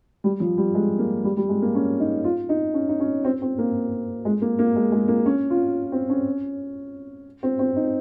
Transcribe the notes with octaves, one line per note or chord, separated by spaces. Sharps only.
G3
F3
G3
G#3
A#3
G3
G3
G#3
A#3
C#4
D#4
F4
D#4
C#4
D#4
C#4
C4
C4
A#3
G#3
A#3
A#3
G#3
G#3
A#3
C#4
F4
C4
C#4
C4
C4
D#4